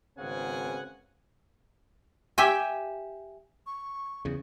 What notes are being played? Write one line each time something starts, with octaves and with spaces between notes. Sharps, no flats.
G#1 C#3 B3 C4 F#5 G#5
G4 E5 G5 G#5
C#6
E2 C#3